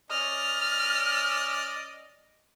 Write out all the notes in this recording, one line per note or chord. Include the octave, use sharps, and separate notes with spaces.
C#4 D5 D#5 F6